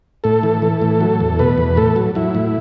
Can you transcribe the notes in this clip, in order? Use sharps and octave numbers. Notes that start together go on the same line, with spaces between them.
A2 A4
E3
E3
A2
F#3
E2
B2 B4
E2
A2 A4
F#3
F#3 E4
A2